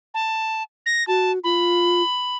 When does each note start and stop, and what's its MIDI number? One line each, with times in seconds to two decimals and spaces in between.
0.14 0.63 81
0.86 1.06 94
1.07 1.39 66
1.07 1.32 81
1.44 2.02 65
1.44 2.37 83